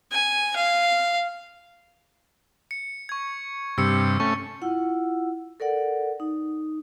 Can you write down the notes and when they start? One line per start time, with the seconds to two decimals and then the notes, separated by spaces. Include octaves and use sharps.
0.12 G#5
0.56 F5
2.71 C#7
3.09 C#6 G#6
3.78 G2 C3 E6 C#7
4.20 A3 C#4 C#6
4.62 E4 F4 F#5 E6
5.60 A4 A#4 D5 F#5
6.20 D#4